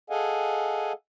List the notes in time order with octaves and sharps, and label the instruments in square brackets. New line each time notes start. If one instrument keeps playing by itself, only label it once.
[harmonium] G#4 A4 D#5 F5 F#5 G#5